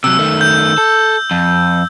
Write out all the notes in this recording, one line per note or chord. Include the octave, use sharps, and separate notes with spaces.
C3 F#3 E6
D#3 A3
G6
A4
F2